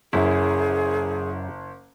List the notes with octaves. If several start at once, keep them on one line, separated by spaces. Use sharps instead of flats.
F#1 F#2 E4 G#4